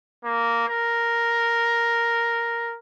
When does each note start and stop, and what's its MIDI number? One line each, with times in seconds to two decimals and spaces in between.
0.24 0.67 58
0.69 2.77 70